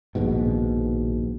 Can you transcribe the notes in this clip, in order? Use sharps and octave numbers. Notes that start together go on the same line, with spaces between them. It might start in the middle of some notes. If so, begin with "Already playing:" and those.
A#1 D#2 G#2 B2